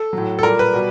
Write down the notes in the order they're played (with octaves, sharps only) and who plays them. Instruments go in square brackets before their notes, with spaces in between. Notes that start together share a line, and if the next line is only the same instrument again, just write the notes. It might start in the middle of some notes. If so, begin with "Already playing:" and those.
Already playing: [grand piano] A4
A2 F#3
A4
A#2 G3 A#4
B4
B2 G3